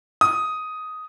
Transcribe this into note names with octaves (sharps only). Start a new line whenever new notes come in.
D#6